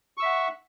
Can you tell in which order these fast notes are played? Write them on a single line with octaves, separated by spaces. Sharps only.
C#6 E6 E5 F#5